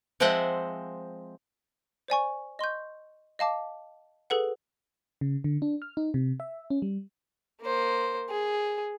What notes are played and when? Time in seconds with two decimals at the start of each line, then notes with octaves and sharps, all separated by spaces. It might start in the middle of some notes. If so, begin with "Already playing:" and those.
0.20 F3 G#3 C4 C5 E5 F#5
2.08 C5 D5 G#5 C#6
2.59 D#5 C6 C#6 G6
3.39 D#5 F5 A5 D6
4.30 G#4 A4 B4 F#5
5.21 C#3
5.44 D3
5.62 D4
5.82 F6
5.97 D#4
6.14 C3
6.40 E5
6.70 C#4
6.82 G3
7.62 A#3 C5
8.29 G#4